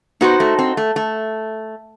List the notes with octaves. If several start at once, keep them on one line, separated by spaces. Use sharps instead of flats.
B3 D#4 F#4 C5
A3
C4
A3
A3